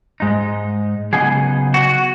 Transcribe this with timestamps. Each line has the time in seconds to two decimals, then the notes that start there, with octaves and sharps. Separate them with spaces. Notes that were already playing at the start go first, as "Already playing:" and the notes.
0.20 G#2 G#3 D#4
1.13 C#3 F#3 B3 D#4 G#4
1.74 F#4